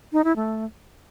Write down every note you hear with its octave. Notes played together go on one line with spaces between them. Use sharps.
D#4
E4
A3